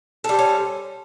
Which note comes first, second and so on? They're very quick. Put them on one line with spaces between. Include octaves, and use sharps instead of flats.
A4 G3 C5 C#4